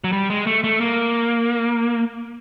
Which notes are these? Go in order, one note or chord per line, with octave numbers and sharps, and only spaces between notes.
F#3
G3
G#3
A3
A3
A#3